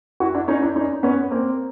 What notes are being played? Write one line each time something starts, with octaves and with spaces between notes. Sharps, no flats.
E4 F#4
D4 E4
C#4 D#4
D4 E4
C#4 D#4
B3 C#4
A#3 C4